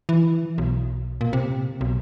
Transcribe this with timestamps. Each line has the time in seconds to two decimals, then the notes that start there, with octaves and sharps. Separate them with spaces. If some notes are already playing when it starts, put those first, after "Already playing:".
0.09 E3
0.58 B1
1.21 A#2
1.33 C3
1.81 B1